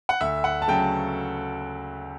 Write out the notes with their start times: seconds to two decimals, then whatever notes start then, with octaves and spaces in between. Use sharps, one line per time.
0.09 F#5
0.21 D2 E5
0.44 F#5
0.62 A5
0.68 C#3 F#3 A3 G5